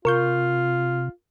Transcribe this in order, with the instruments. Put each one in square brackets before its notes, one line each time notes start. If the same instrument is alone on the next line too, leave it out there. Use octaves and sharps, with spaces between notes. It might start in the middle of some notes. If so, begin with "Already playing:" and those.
[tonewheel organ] C3 [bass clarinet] F4 [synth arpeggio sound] A#4 C#6 G6